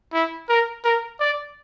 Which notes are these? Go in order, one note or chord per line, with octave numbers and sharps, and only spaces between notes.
E4
A#4
A#4
D5